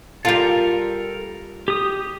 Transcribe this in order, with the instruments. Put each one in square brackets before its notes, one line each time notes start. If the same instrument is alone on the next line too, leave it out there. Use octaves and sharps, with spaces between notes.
[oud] G3 F4 [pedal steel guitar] A4 A#4
[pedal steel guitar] G4 D#6